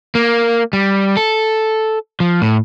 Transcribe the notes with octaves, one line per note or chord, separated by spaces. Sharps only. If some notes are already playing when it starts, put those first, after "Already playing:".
A#3
G3
A4
F3
A2